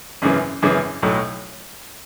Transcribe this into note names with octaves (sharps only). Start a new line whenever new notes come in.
G#1 F#2 C#3 E3
G#1 F#2 C#3 E3
B1 A2 F#3